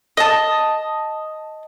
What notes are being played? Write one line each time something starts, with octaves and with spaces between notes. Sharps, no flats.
D#5 A5